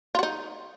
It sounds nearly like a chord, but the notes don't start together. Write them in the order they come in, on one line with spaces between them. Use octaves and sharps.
F4 F#4 D#4